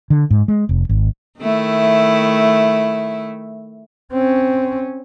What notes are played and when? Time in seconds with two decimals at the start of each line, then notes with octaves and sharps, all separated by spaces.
0.10 D3
0.30 G#2
0.48 G#3
0.69 F1
0.89 G#1
1.40 D#3 A3 E4
4.13 C4 C#4